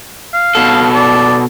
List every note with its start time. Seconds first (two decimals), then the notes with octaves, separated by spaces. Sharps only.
0.34 F5
0.55 B2 A4
0.95 D5